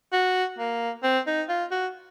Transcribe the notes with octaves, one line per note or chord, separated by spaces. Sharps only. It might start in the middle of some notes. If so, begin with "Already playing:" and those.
F#4
A#3
C4
D#4
F4
F#4